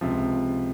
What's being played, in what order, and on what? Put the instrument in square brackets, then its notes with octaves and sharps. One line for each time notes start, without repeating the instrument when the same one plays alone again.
[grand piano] C#2 C3 F3